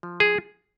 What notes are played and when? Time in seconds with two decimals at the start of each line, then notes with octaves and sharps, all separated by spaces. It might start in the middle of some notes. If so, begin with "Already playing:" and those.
0.03 F3
0.20 G#4